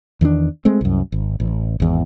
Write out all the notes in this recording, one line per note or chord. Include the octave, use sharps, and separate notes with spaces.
E2 D#3 A3 D4
G#3 A3 C4
C2 F#2
G#1
A1
G#1 E2